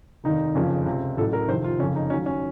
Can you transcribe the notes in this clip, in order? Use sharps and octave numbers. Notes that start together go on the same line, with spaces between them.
F1 D#2 D#3 D#4
F#1 F2 C#3 F3
C#2 C3 F3
A1 A2 F#3 A4
A#4
F2 C3 D#3 C5
F4
F#1 F2 C#3 C#4
D#4
D#2 D#3 F#3 C#4
C#4